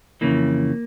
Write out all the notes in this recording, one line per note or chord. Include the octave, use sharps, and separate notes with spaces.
F2 C#3 E3 A#3